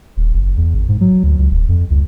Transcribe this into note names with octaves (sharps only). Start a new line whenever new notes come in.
D#1
F#1
E2
G#1
G#2
F#3
D2
C#2
D#1
F2
C#2